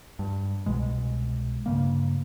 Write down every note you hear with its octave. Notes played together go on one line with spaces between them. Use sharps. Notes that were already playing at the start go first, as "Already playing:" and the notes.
G2
C2 B2 G#3
G2 C#3 A#3